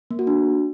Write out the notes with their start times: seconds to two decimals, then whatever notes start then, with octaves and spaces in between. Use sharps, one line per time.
0.11 A#3
0.19 F#4
0.27 D4